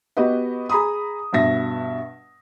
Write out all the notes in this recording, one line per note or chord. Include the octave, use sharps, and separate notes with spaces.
B3 F#4 G4 B4 D#5
G#4 A#5 B5 D#6
G2 B2 E5 A#6